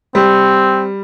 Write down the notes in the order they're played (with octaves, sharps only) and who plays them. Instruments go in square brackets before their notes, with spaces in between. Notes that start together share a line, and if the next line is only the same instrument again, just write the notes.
[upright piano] G3 [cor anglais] C4